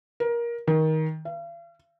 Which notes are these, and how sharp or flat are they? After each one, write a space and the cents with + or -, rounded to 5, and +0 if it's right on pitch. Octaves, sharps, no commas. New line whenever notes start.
A#4 +20
D#3 +20
F5 -45